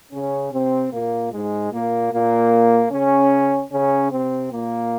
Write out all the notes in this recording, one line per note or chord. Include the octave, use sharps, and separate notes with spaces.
C#3 C#4
C3 C4
A#2 A#3
G#2 G#3
A#2 A#3
A#2 A#3
C#3 C#4
C#3 C#4
C3 C4
A#2 A#3